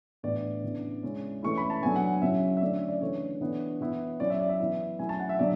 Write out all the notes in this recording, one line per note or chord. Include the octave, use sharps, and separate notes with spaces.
A2 E3 B3 D4 D5
C#3 E3 B3 D4
C#3 G#3 C#4 E4
E3 A3 C#4 E4 C#6
B5
A5
F#3 B3 D4 G#5
F#5
C#3 F#3 C#4 E4 E5
E5
D3 A3 C#4 E4 D5
E5
D5
C#3 E3 A3 D4 C#5
E3 B3 D4
E3 B3 E4
F#3 C#4 E4 D5
E5
D5
E5
E3 B3 E4
F#3 A3 C#4 E4 G#5
A5
F#5
E5
D3 F#3 D5